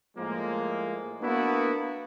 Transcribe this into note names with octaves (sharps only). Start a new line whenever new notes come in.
A2 F3 G#3 A#3
A#3 B3 D4 E4 F#4